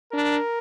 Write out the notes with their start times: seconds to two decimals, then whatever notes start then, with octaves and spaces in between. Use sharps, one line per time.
0.12 D4 A#4